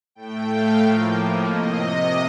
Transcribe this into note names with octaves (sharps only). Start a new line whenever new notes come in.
A2 A3 G5
F5
A2 F3 A#3
C3 D#5